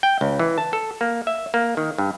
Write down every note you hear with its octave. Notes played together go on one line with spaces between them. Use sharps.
G5
C#2
E3
A5
A4
A#3
E5
A#3
D#3
G2